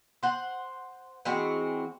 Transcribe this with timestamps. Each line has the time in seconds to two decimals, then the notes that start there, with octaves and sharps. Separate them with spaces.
0.23 C5 F#5
1.25 E3 G#3 C4 F#4